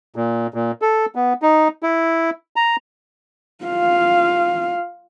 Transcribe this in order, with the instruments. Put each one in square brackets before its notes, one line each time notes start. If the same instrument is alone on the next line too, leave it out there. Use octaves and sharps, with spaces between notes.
[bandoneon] A#2
A#2
A4
B3
D#4
E4
A#5
[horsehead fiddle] F4 F5